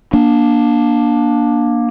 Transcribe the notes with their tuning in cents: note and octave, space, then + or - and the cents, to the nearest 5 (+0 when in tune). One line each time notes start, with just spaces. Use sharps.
A#3 +20 D4 +0